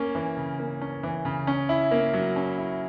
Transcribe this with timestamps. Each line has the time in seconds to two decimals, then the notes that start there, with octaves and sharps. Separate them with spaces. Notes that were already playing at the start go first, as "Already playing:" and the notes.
Already playing: A#3 C#4
0.15 E3
0.37 C#3
0.59 A#3
0.81 C#4
1.03 E3
1.25 C#3
1.47 C#4
1.69 E4
1.91 A#3
2.13 F#3
2.36 C#4
2.58 E4